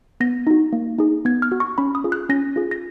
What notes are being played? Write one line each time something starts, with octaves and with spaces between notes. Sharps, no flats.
B3 A#6
D#4 F#4
A#3
D#4 G#4
B3 G#6
F6
F#4
C#6
C#4 B5
D#6
F4 G#4
F#6
C#4 A#6
F4 G#4
A#6